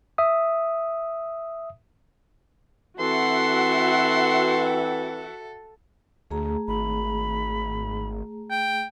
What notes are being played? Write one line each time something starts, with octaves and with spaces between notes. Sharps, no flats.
E5 D#6
E3 C4 F#4 A4 E5 F#5 C6
D2 A3 G#4 A#5
G#1 B5
G5